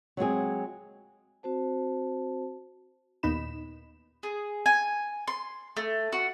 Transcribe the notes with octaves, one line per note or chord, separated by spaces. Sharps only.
F#3 G#3 C4 G#4
C4 F#4 C5 A5
D#2 A#2 B3 D#4 B5 E7
G#4
G#5
C6
A3
F#4